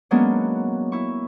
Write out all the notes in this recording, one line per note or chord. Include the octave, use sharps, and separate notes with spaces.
F#3 G#3 A#3 B3 C#4 D4
E4 C#6